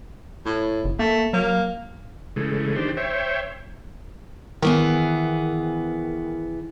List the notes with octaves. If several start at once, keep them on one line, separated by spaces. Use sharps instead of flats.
A2
F#1
A3 A#3
F#3 A#3
C#3 E3 G#3 A3
D#3 D4 G4 C5
C5 C#5 E5 G5
D#3 E3 B3 G#4